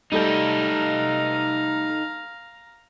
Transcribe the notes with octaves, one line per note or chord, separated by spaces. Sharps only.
G3 A3 D#4 A4 F5 A#5 G6